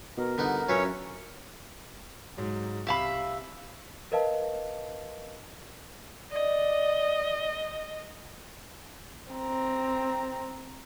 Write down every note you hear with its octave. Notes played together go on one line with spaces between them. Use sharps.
B2 A#4
G1 D3 B3 D#4
F#2 C#4 F4 B4 C#5 E5
G#2 F#3
C2 C3 E5 F5 B5
A#4 B4 D#5 F5 A5
D5 D#5
C4 A#5